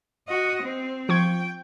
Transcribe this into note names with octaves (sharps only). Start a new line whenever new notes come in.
F#4 D#5
C4
F3 G5 C#6 G#6